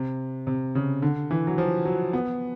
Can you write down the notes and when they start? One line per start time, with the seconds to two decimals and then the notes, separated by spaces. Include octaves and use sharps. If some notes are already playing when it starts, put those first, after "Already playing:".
Already playing: C3
0.47 C3
0.75 C#3
1.02 D3
1.31 E3
1.47 F#3
1.58 F3
1.85 F#3
2.13 B3